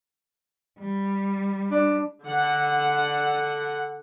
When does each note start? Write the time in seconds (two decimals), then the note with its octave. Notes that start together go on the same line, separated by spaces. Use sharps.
0.79 G3
1.71 D4
2.24 D3 F#5